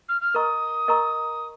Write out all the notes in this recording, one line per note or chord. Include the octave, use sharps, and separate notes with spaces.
F6
F6
A#4 D#5 A#5 C#6 D#6
A#4 D#5 A#5 C#6